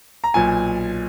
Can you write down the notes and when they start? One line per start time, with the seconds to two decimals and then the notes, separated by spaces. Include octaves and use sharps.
0.24 A#5
0.34 B1 A#2 G#5